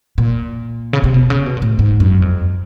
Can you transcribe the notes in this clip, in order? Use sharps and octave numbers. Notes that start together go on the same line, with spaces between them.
A#2
C#3
C3
B2
C#3
B2
A#2
A2
G#2
F#2
F2